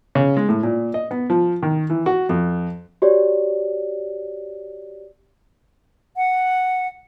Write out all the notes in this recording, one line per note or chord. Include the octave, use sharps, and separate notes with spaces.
C#3
G#3
A2
A#2
D#5
B3
F3
D#3
E3
F#4
F2
F#4 G4 C#5 D5
F#5